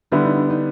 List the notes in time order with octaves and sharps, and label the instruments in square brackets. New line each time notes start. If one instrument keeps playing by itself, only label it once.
[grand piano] D3 G3 B3 E4 [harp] D4
[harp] D#4
D4
D#4